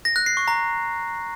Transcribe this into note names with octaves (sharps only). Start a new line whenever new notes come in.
A#6
F#6
C7
C#6
A#5